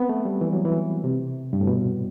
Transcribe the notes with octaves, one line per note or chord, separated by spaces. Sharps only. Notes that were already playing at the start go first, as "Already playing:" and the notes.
Already playing: B3 C4
A3
G3
E3
F#3
E3
C3
G2
A2
B2